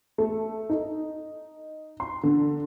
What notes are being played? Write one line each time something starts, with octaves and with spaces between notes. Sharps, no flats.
A3
D#4
C6
D3